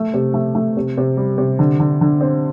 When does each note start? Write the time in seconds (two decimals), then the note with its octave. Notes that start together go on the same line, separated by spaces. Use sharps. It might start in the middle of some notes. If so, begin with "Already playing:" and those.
Already playing: A3
0.14 C3
0.34 A3
0.55 A3
0.77 C3
0.97 C3
1.17 G3
1.38 C3
1.59 D3
1.80 D3
2.01 D3
2.21 C4